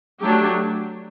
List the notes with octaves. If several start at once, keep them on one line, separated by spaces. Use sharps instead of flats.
F#3 A3 D4 G4